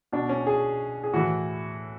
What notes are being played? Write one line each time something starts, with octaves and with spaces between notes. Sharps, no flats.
B2 D4
C#4
G#4
G#4
A2 E3 F#4